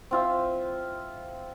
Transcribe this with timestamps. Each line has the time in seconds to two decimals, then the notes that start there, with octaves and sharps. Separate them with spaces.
0.11 C4 F4 E5